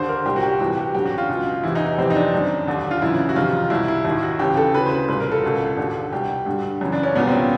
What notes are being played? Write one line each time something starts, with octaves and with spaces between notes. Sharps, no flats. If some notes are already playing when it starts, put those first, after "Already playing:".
Already playing: D#2 D3 C5
A#4
C2 A#2 G4
F#4
G4
C2 C3 E3 F#4
G4
F#2 D3 G4
F#4
F4
C#2 B2
E2 C3 E3 E4
D#4
D#4
F2 C3 E3 C4
D#4
D4
F#2 D#3
D#2 D3
F4
F#2 C#3 E3 E4
F#4
F2 C3 D#3 F4
C2 B2 E4
E4
D#2 D#3 E4
F#4
D#2 C#3 E3 G4
A4
D2 C#3 E3 B4
C5
B4
C2 A#2 B4
A#4
A4
C#2 B2
D#2 D3
C2 B2 G4
G2 D3
F#2 C#3 E3
D4
C#4
C2 A#2 B3
C4
C#4